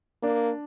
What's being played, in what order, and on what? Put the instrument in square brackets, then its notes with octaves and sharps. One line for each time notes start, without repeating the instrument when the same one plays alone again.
[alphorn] A#3 [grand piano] D4